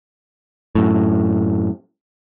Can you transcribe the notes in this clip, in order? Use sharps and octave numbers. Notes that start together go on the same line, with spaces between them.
F#2 A2